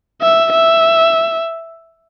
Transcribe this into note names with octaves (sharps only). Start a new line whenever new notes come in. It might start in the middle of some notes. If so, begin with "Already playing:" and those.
E5
E5